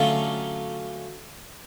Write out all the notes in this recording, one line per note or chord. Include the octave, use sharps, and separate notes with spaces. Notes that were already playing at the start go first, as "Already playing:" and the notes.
Already playing: D3 F#3 A3 C#4 F4